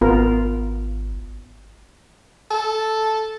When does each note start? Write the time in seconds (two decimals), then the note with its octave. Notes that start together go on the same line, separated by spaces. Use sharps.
0.01 G#1 B3 F4 A#4
2.51 A4